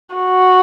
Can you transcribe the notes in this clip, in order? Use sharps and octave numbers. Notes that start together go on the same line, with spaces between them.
F#4